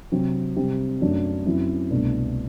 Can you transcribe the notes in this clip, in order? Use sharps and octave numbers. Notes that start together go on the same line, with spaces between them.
C3 F#3 C4
C3 G3 C4
F#2 F#3 A3 D4
F#2 F#3 C4 E4
C2 B2 A3 D4